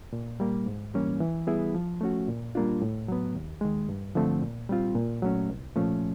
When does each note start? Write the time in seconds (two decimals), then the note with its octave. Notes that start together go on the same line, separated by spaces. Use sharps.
0.13 A#2
0.40 G3 A#3
0.66 G#2
0.94 E3 G3 A#3 C#4
1.20 E3
1.47 G3 B3 E4 G#4
1.75 F3
2.01 A3 C#4 F#4
2.28 A#2
2.55 G3 A#3 D4 F4
2.82 A2
3.08 F#3 B3
3.35 D#2
3.61 D#3 G#3
3.89 G2
4.15 D3 F3 A3 C4
4.41 A#2
4.69 G3 C4 F4
4.95 A#2
5.22 F#3 A3 C#4
5.49 C2
5.76 A#2 F3 A3 C#4